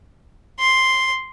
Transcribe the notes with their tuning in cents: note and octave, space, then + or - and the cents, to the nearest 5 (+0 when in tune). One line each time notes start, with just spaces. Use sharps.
C6 +0